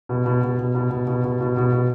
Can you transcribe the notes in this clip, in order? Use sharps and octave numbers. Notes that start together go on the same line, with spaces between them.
B2
B2
B2
B2
B2
B2
B2
B2
B2
B2
B2